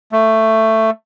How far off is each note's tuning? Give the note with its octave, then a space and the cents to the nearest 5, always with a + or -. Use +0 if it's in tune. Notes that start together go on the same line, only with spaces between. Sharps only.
A3 +10